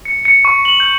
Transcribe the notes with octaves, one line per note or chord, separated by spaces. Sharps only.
C#7
C#7
C#6
F#7
G6